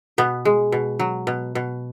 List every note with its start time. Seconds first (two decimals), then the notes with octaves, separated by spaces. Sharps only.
0.18 B2 B3
0.45 G#3
0.72 B2
1.00 F#3
1.27 B2
1.55 B2